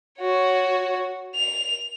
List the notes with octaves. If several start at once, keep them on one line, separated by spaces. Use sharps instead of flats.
F#4 C#5
F7